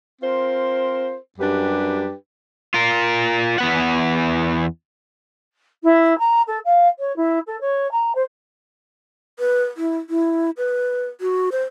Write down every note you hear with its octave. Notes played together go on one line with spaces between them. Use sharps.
C4 F4 A#4 C5
F#2 G3 D4 G4 B4
F4 A#4
E2 B3 F#5
E4
A#5
A4
F5
C#5
E4
A4
C#5
A#5
C5
B4
E4
E4
B4
F#4
C5